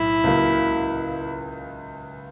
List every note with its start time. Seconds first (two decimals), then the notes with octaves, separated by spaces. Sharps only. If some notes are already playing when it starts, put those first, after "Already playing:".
Already playing: B1 A2 E4
0.24 C#2 C#3 F#3 A#3